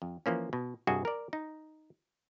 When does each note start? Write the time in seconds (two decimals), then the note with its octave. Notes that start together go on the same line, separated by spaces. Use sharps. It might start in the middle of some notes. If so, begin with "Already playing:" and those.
0.02 F2
0.26 E3 F3 A#3 C#4
0.53 B2
0.87 C2 G2 F#4 G#4 D#5 G#5
1.05 A#4 D5
1.33 D#4